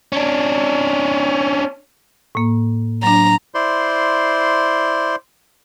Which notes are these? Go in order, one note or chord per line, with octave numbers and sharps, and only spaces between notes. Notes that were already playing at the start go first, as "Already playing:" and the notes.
C#4 D4
A2 A#3
F#3 D4 A#5
E4 C5 D5 C6